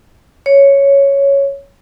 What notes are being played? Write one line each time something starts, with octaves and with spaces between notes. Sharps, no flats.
C#5